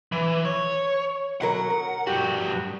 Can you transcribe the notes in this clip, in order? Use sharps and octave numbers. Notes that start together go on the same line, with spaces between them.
E3
C#5
B2 F#3 A#4 F#5
A#4
G2 F#4 G4